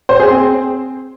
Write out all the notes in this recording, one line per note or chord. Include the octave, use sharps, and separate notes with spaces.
C5
G#4
C4